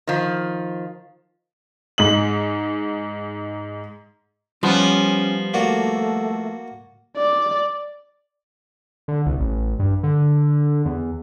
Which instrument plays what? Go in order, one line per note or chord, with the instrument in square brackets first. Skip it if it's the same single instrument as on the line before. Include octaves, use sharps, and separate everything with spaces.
[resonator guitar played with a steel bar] D#3 F3
[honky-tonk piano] G#2 D#4 F#7
[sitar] F3 B3 [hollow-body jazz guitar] G3 [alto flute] C#4
[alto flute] A3 [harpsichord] A#3 F#4 D5
[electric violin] D5
[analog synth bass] D3
C2
A1
G2
D3
E2